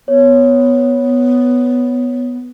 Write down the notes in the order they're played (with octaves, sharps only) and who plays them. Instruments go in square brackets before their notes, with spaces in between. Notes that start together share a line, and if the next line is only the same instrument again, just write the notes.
[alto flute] B3 [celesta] C#5